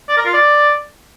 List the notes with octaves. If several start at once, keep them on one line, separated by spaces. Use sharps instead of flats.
D5
A#4
F4
D5